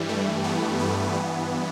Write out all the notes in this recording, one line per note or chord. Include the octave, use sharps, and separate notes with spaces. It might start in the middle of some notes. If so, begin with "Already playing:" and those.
Already playing: G2 E3 G3
A3
B3
B3
G2 E3